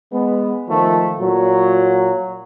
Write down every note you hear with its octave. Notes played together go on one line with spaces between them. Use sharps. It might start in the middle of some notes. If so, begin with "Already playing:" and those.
G#3 B3
D#3 F3 A3
A#2 F#3